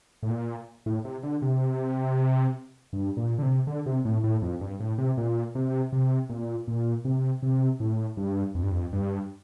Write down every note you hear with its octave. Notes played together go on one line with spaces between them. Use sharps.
A2
A#2
A2
C3
D3
C3
G2
A#2
D3
C3
D3
C3
A2
A2
F2
G2
A2
C3
A#2
C3
C3
A#2
A#2
C3
C3
A2
G2
F2
G2
F2
G2